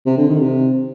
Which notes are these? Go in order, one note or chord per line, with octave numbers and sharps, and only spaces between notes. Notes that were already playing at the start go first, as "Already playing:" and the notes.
C3
D3
D#3
C3